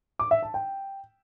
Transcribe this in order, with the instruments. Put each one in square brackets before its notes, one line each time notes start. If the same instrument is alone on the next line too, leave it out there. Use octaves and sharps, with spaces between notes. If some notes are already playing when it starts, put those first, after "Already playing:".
[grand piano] D6
E5
A5
G5